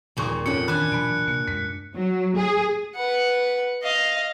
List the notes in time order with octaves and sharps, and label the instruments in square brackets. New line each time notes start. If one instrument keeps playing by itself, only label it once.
[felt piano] D#1 G#4 C#6 [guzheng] F2 A#2
[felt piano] F2 C3 C#4 [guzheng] F#5 G5 [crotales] C#7
[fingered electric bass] D#3 E3 [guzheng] D4 G#5 [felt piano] B5 [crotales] F#6
[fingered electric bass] B2 E3 F#3 [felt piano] B5 D7
[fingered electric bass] C3 A#3 [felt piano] C#7
[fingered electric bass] F#2 G#3 [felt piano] B6
[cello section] F#3
G#4
[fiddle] B4 F#5
D#5 F5